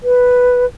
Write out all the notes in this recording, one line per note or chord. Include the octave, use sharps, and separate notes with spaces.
B4